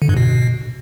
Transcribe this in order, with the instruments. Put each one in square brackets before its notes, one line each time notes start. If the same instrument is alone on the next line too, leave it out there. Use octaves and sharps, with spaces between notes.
[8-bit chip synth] D3
G2
B2